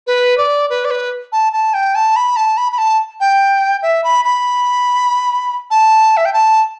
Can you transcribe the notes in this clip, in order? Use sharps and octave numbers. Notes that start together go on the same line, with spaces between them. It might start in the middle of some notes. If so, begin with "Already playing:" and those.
B4
D5
B4
D5
B4
A5
A5
G5
A5
B5
A5
B5
B5
A5
G5
E5
B5
B5
A5
E5
G5
A5